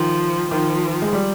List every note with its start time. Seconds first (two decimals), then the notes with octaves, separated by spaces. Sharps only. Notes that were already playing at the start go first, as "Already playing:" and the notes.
Already playing: D#3 F3
0.51 D#3 F3
1.02 G#3
1.13 G3